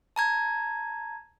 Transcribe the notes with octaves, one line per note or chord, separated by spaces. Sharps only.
A5 A#5 G#6